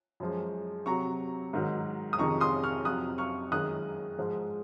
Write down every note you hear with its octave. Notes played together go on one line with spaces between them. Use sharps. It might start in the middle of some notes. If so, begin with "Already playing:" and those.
F#2 F3 G#3
C3 F#3 A#5 C#6
G#2 D#3 F#3
D#6
F2 C3 D#3 G#3 A#5 C#6
C6 D#6
C#6 F6
F2 C3 F#3 D#6 F#6
C#6 F6
F#2 D#3 G#3 D#6 F#6
G#2 F3 G#3